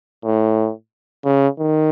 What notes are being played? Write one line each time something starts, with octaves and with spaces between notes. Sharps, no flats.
A2
C#3
D#3